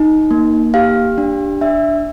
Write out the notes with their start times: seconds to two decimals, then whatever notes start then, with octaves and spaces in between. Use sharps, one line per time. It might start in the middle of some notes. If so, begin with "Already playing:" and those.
Already playing: D#4
0.31 A#3
0.74 G4 F5
1.18 D4
1.61 D4 E5